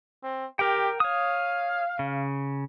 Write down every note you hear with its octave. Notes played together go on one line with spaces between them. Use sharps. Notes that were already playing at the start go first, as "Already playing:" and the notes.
C4
G4 A#4 G5
C#5 F5 D#6
C#3